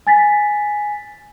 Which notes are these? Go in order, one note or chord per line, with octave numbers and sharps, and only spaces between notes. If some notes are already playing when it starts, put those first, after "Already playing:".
G#5 A6 B6